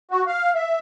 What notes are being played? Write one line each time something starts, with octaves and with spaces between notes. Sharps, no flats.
F#4
F5
E5